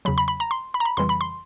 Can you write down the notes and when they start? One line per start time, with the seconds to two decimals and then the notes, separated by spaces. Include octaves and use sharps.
0.05 E2 C#3 F#3 B5
0.18 B5
0.28 B5
0.40 A#5
0.51 C6
0.74 B5
0.80 A#5
0.85 B5
0.97 F2 C#3 E3 G3 C6
1.09 B5
1.21 C6